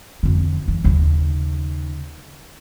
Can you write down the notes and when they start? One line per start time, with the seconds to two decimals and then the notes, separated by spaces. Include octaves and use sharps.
0.23 F2 D3
0.68 E3
0.84 D#2 C#3